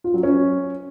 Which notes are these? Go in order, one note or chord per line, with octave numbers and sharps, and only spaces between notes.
F4
F#3
C#4